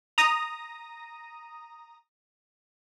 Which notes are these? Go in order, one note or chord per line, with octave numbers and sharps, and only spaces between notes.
A#5 D#6 A#6